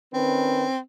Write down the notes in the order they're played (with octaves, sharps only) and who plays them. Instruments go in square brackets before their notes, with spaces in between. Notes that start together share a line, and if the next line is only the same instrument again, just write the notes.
[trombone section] D#3 C#4 B4 [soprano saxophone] C4